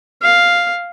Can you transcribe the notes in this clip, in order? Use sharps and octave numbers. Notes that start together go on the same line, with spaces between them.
F5